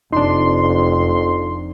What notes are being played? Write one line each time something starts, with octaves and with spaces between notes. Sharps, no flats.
F1 F2 D4 D#4 C6